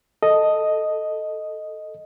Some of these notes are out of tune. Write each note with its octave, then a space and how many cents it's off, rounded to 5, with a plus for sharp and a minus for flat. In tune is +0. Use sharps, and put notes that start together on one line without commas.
A4 +0 D#5 +0